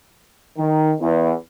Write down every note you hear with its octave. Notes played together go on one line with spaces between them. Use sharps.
D#3
E2